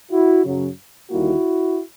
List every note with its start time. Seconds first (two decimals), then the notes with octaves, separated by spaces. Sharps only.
0.12 E4 F#4
0.45 F#2 C#3 F#3
1.11 D#2 D3 G3 A#3 D#4 E4 F#4